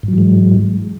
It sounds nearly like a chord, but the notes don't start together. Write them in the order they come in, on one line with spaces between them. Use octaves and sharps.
G#2 F#3 E3 G#3